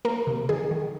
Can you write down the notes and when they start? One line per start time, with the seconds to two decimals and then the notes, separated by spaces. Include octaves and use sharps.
0.05 A#3 A#4
0.27 C3
0.49 D#3 G#4
0.71 D#3